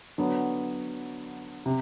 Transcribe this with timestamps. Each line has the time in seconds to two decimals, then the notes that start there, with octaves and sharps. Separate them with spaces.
0.18 D3 F#3 B3
1.66 C3